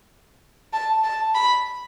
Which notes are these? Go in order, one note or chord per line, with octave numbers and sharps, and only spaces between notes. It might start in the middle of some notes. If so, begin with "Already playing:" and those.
A5
A5
B5